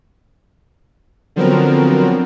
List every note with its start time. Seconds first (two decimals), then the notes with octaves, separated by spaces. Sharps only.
1.36 D3 F3 F#3 B3 C4 A#4